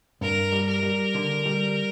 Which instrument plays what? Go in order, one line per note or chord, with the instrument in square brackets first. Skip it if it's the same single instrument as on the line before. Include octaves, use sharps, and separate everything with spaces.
[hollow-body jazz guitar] G2 [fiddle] A#4
[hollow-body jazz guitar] G3
[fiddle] A#4
[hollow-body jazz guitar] G3
D3
G3